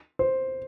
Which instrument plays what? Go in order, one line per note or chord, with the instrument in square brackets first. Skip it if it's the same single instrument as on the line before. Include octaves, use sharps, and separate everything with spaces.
[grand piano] C5